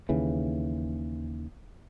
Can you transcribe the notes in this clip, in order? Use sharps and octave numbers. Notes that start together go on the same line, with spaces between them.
D#2 C#3 E3